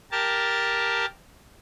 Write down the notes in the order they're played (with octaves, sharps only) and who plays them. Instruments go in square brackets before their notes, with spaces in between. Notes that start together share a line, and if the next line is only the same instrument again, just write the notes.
[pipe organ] G4 A#4 A5